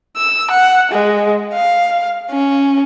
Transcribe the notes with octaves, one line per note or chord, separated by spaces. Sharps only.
E6
F#5
G#3
F5
C#4